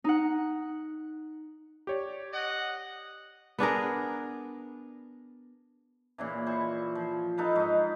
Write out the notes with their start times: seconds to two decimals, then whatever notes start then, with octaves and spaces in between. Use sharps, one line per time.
0.04 D#4 F#5
1.87 G4 C#5 D5
2.33 D#5 F#5
3.58 B3 D4 G#4 A#4
6.18 A#2 C#3 E3
6.46 E4 C5 C#6
6.95 F3
7.37 D#4 A4 B4 F5
7.56 G#2 D#4